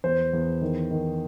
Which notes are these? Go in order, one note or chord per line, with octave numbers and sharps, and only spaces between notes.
E2 C5
E2
D#3
D#3